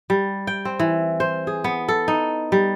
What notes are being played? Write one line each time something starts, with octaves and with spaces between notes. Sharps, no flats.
G3
G5
C4
E3
C5
G#4
B3
A4
D#4
G3